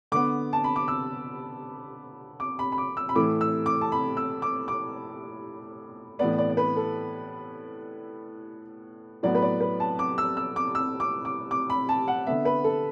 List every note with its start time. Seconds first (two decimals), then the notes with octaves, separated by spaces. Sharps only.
0.12 D3 B3 D6
0.53 A5
0.64 B5
0.76 D6
0.88 E6
2.40 D6
2.59 B5
2.72 B5
2.78 D6
2.97 E6
3.09 B5
3.15 A2 E3 A3 D6
3.41 E6
3.66 D6
3.81 A5
3.92 B5
4.17 E6
4.42 D6
4.68 D6
6.19 A2 E3 B3 D5
6.38 D5
6.50 D5
6.57 B4
6.76 A4
9.23 A2 F#3 B3 D5
9.35 B4
9.42 D5
9.60 B4
9.80 A5
9.99 D6
10.18 E6
10.37 E6
10.56 D6
10.75 E6
11.00 D6
11.25 D6
11.51 D6
11.70 B5
11.89 A5
12.08 F#5
12.26 D3 B3 E5
12.45 B4
12.64 A4